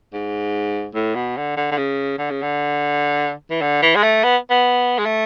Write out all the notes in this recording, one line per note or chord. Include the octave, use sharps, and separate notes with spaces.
G#2
A2
B2
D3
D3
D3
C#3
D3
C#3
D3
E3
D3
E3
G#3
A3
B3
B3
G#3
A3